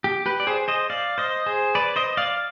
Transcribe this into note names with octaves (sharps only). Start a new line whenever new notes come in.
G4
G4 B4
D5
G#4 C5
C5 D#5
D5 F5
C5 D#5
G#4 C5
B4 D5
C5 D#5
D5 F5